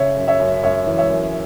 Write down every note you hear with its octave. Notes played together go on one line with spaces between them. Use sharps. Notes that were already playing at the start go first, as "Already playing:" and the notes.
Already playing: C#3 C#5 E5
F#2
C#5 E5
F#2
F#2 C#5 E5
E3
C#5 E5
F#2